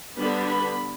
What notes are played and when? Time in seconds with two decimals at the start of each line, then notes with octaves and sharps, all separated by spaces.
0.17 D3 G3 B3 D4 B5
0.47 B5